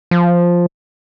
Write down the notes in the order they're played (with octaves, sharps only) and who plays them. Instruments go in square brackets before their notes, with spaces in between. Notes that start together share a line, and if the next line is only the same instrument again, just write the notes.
[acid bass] F3